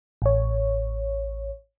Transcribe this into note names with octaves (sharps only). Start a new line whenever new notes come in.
A1 C#5